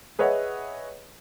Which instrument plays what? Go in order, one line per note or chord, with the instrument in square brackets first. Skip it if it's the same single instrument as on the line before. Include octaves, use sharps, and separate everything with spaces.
[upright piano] G#4 B4 C#5 D#5 E5 F#5